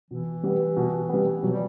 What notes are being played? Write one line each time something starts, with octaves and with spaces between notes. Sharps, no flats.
B2 E3
G3 B3
B2
G3 B3
B2 F#3
G3